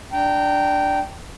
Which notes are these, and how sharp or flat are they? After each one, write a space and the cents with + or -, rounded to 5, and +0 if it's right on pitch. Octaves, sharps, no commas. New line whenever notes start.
D4 +0 G5 -15 A#5 -20